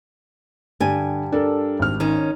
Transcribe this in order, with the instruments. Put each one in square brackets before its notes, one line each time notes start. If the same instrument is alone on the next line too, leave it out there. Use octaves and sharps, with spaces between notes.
[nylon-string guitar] G2 G3 G#5 [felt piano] D3
[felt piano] D4 A4 A#4
G#1 F6
[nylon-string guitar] D#3 C#4